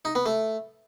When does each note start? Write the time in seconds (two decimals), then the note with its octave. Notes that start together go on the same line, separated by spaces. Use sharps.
0.05 D#4
0.15 B3
0.26 A3